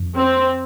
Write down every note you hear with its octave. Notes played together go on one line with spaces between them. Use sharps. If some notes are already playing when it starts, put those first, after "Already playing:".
Already playing: F2
C4